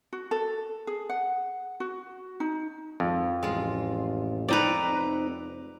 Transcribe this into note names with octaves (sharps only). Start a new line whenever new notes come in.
F#4
A4
G#4
F#5
F#4
D#4
G#1 F2
A1 G#3 F4
F1 C4 D#4 B4 D5 A#5